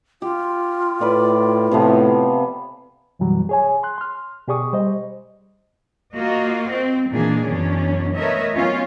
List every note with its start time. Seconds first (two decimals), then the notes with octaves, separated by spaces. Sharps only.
0.22 F4 G4
1.01 A2 B4 D5
1.71 A2 C3 F3 B3
3.19 F#2 B2 E3 F#3 G3
3.49 G#4 C#5 G#5
3.83 C6 F#6
3.98 C6 F6
4.48 B2 G4 G#4 D5 C#6 D#6
4.73 G3 C5 D#5
6.15 A#3 F4 F#4 D#5
6.70 C4
7.10 A#2 D#3 E3 A#3 D4 G#4
7.43 F#2 B2 E3 C#4 D4
8.15 A3 A#4 B4 C#5 D#5 E5
8.54 F#3 B3 C#4 F4